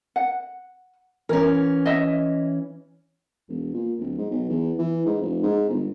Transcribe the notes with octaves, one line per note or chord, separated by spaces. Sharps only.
F#5
E3 C#4 A#4
D#5 E5
E1
A#2
D1
G#2
B1
E2
E3
G#2
F1
G#2
G1